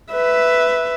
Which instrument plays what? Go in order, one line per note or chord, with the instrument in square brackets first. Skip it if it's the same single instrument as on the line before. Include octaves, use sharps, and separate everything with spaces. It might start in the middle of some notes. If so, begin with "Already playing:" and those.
[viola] B4 E5